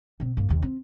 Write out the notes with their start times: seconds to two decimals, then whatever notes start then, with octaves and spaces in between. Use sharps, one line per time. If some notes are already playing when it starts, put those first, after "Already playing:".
0.20 B2 C4
0.37 G2 A#3
0.49 D#2 C3
0.62 C4